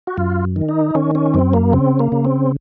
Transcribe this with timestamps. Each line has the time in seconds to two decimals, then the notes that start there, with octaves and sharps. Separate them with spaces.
0.07 F#4
0.17 F#2 F4
0.56 D#3
0.69 D#4
0.95 D#3 C#4
1.15 C#4
1.34 F#2 C4
1.53 A#3
1.73 C#3 C4
1.99 A#3
2.12 C#3
2.25 C4